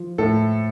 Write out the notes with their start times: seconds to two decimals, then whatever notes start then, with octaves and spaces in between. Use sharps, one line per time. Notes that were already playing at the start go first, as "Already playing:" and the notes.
Already playing: F3
0.18 A2 A4